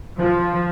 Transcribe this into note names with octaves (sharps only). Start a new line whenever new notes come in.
F3